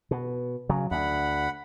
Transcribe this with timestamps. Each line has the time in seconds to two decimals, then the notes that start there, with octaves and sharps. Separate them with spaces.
0.11 B2
0.69 C#3 F#3
0.91 D2 F#5 B5